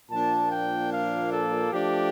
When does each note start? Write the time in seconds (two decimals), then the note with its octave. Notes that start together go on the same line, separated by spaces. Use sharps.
0.11 A#2 F3 A#3 D4 A5
0.51 G5
0.93 F5
1.32 A4
1.73 F3 A3 D4 G4